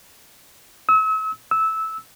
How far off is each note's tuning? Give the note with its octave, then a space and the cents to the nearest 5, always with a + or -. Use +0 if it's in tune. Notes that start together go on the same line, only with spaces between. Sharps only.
E6 -40
E6 -15